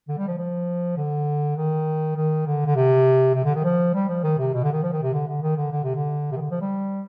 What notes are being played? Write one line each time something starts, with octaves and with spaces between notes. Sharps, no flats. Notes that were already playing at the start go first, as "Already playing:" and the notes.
D3
G3
F3
F3
D3
D#3
D#3
D3
D3
C3
C3
D3
D#3
F3
G3
F3
D#3
C3
B2
D3
D#3
F3
D#3
C3
D3
D3
D#3
D3
D3
C3
D3
C3
D#3
D3
F3
G3